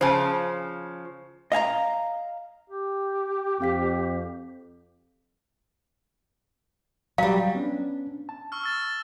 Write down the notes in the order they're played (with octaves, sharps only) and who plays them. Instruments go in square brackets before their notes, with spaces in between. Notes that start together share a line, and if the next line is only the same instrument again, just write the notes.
[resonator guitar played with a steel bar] C#3 F3 [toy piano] C5 G#5 A5
[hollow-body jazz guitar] D#5 F5 G#5 A#5
[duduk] G4
[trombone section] F2 [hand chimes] C4 F5 B6
[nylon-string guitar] F#3 G3 [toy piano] F5
[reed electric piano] B3 C#4 D4
A5
[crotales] C#6 E6 F6
E6 A6 E7